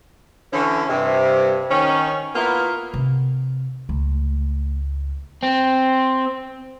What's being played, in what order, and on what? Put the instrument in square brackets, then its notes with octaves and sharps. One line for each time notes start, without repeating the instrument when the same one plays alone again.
[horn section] D3 E3 C#4
G2 C3
D#3 C#4
A#3 B3 E4 F4
[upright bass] C3
[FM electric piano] C#2 [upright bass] A3
[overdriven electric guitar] C4